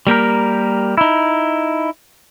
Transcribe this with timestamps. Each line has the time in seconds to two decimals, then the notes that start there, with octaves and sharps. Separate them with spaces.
0.07 G3 A#3 G4 A#4
0.98 D#4 E4